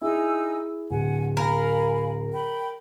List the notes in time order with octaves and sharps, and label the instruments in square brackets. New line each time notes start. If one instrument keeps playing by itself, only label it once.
[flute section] D#4 G#5 E6 [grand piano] E4 G#4
[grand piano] D1 [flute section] F#5 G#5
[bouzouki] A#4 [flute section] F5 G#5 B5
[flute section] G5 B5